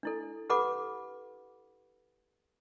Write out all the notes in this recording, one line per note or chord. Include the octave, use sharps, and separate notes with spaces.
D4 E4 A4
G4 A4 B4 F#5 B5 D6